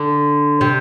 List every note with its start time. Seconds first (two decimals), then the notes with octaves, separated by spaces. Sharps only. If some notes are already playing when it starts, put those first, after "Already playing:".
Already playing: D3
0.61 C3